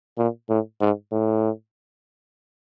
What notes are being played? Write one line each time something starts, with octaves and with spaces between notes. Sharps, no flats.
A#2
A2
G#2
A2